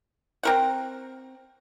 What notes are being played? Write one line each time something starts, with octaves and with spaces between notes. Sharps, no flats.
C4 A#4 F#5